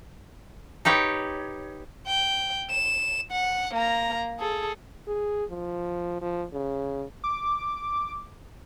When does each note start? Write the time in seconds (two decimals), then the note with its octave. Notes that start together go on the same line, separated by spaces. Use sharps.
0.85 D#4 G4 B4 C#5
2.07 G5
2.70 E7
3.32 F#5
3.74 A#3 A#5
4.39 G#4 A4
5.08 G#4
5.51 F3
6.21 F3
6.53 C#3
7.24 D6